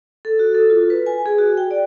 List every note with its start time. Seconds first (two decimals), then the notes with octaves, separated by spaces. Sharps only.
0.25 A4
0.39 F#4
0.55 A4
0.70 F4
0.90 B4
1.06 G#5
1.26 G#4
1.38 F#4
1.57 G5
1.71 D5